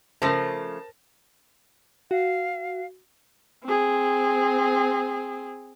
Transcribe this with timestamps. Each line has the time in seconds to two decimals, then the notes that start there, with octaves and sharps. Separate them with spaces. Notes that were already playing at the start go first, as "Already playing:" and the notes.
0.22 C#3 F3 A3 A#4 C5 A5 A#6
2.11 F#4 F5
3.64 C4 G#4